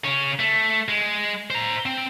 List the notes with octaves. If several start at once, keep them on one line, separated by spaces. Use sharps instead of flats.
C#3 C#4
A3
G#3
C5 A#5
C4